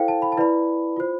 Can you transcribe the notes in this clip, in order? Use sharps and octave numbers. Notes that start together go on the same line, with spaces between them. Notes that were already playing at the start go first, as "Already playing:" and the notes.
Already playing: E4 A4 C5 F5 G5
A5
B5
A5
E4 B4 D5 B5
F4 C5